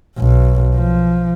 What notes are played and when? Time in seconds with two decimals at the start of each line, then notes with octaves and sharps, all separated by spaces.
0.18 B1
0.75 F3